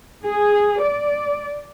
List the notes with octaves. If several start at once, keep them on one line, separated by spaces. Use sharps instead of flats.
G#4
D5